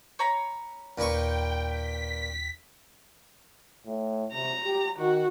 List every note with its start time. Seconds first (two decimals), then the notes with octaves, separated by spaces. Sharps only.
0.19 C#5 A#5 B5
0.98 D#2 A#2 B4 G5 C#6
1.66 B6
3.86 A2
4.33 C3 A#5
4.65 G4
4.99 D#3 F#4